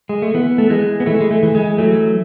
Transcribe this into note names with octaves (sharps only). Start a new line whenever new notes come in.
G#3
A3
E3 B3
A3
E3 G#3
B3
E3 A3
G#3
A3
E3
G#3
F#3 A3